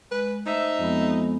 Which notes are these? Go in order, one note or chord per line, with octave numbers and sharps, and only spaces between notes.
G#3 B4
A3 D#4 C5 E5
F2 G#3 B3